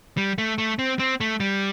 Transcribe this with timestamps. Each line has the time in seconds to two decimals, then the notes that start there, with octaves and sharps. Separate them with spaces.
0.17 G3
0.38 A3
0.58 A3
0.79 C4
0.99 C4
1.20 A3
1.40 G3